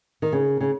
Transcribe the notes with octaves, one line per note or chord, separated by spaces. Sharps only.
D#3
C#3
C#3